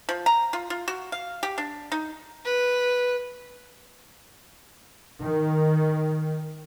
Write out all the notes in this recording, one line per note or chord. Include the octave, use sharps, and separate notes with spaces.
F3
A#5
F4
F4
F#4
F5
G4
D4
D#4
B4
D#3